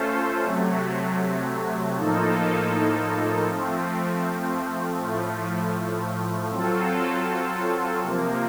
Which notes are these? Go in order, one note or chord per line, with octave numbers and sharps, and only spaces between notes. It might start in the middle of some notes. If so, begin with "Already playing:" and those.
Already playing: A3 C#4 F4 A4 C5
C3 F#3 A3
A2 F3 A#3 D#4 A4
F3 A3 C4
A2 F3 A3
F#3 C4 F4 A4
C3 F3 A#3